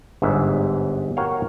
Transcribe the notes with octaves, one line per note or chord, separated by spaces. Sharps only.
G1 G#2 E5
F#4 A#4 C#5 F5 G5